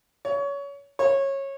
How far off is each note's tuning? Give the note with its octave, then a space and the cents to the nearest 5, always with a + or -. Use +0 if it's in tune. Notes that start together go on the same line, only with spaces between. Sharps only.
C#5 +25
C#5 -20